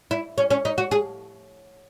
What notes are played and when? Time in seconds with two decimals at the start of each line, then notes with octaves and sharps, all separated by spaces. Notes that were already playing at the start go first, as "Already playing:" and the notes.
0.11 E4
0.38 C#4
0.50 C#4
0.65 D#4
0.78 F#4
0.91 G#4